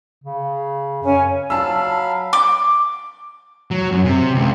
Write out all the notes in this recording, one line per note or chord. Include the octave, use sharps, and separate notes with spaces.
C#3
F#2 C#4 G#5
F#3 F5 A5 B5 E6
D6
F#3
F#2
C3
C#2